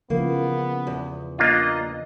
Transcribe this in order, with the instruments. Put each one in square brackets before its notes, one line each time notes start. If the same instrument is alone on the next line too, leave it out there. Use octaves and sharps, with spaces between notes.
[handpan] C#3 E3 F3 [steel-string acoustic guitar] A#3 [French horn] B3
[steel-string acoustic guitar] E2
[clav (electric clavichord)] A#3 D4 F4 [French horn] D#5